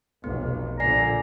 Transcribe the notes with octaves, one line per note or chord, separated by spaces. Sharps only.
F1 B1 B3
A#1 D3 D5 G#5 A#5 C7